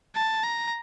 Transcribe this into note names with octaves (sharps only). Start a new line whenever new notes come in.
A5
A#5